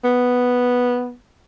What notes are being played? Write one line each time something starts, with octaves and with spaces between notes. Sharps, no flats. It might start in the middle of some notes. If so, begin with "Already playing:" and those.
B3